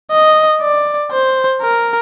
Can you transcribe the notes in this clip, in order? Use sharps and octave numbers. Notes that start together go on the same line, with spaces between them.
D#5
D5
C5
A#4